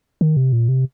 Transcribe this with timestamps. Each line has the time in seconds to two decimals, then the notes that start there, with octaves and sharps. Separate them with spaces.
0.21 D#3
0.37 C3
0.53 A#2
0.68 C3